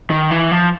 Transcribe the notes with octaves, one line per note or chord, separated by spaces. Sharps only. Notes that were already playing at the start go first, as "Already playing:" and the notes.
D#3
E3
F3